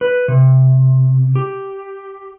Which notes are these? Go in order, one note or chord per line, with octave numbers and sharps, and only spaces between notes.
B4
C3
G4